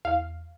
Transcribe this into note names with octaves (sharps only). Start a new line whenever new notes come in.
E2 F5